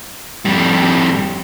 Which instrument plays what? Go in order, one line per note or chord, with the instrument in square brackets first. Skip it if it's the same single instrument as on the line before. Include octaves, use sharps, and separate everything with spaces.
[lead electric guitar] F2 G3